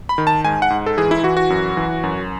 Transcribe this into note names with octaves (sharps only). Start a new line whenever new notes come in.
B5
D#3
A5
G#2 G#5
F#5
G#2
A4
E3 G#4
E4
E3 F#4
F#4
F#2
E3
F#2